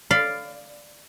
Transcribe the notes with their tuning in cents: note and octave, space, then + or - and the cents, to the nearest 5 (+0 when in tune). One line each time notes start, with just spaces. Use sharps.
D5 +0 F5 +0 B5 +40